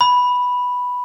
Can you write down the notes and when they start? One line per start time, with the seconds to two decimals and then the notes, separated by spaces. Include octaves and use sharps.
0.01 B5